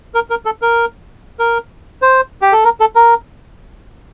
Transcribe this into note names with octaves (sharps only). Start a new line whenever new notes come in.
A#4
A#4
A4
A#4
A#4
C5
G4
A4
A#4
A4
A#4